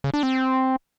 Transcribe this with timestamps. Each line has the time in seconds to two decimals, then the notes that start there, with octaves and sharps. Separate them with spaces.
0.04 C#3
0.14 D4
0.23 C4